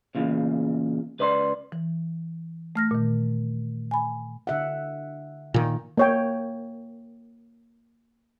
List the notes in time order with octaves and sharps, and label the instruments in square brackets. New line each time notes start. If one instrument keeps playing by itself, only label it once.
[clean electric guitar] E2 A#2 C#3
C#2 B4 D5 C6
[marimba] E3
A3 F6 A#6
A#2 D#3
G#5 B5
[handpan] D3 E5 F#5
[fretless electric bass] A#2 D#3
[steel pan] A#3 C#5 G5